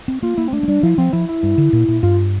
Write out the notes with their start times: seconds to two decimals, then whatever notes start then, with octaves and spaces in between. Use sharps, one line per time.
0.08 C4
0.23 A#3 F4
0.37 A#3 E4
0.48 C4
0.53 A3 D4
0.63 A3
0.68 G3 D4
0.83 F3 E4
0.98 F3 C4
1.13 F3 E4
1.29 E4
1.43 G2
1.58 D3
1.73 A#2
1.88 A#2
2.03 G2 F4